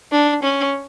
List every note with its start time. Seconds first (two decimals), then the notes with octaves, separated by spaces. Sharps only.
0.12 D4
0.43 C#4